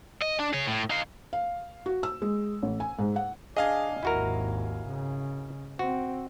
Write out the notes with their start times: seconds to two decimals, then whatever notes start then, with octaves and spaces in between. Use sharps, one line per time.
0.22 D#5
0.40 D4
0.53 G#4 C#5
0.67 A2
0.90 D#4 F5
1.33 F5
1.86 F#4
2.03 E6
2.22 G#3
2.63 A1
2.80 G#5
2.99 G#2
3.16 F#5
3.57 D4 G#4 D#5 F5 G#5
4.03 G#1 D#2 E4 F#4 A#4
4.88 C#3
5.79 C4 F#4